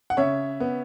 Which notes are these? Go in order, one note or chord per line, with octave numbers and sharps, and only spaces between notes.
F#5
C#3 C#5 E5
B3